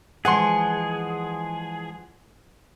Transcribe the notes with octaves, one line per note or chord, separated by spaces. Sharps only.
E3 F3 G#3 G#4 F#5 C6